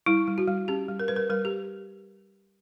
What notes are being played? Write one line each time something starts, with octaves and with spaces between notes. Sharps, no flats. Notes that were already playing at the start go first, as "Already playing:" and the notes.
G3 E4
G3
F#4
G3
C#4 G4
G3
A#4
G3 B4
A#4
G3 A#4
G4